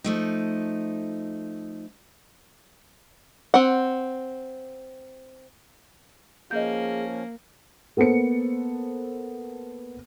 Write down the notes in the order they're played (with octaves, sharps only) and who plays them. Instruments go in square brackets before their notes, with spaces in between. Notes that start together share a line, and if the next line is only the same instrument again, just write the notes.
[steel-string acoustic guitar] F3 A3 D#4
[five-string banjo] C4 F#5
[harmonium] F3 C#4 [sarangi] A#3 [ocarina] G#4 [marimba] D#5 G6
[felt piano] A#3 B3 A4 C5 C#7